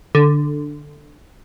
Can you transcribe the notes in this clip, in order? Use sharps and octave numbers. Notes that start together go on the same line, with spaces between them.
D3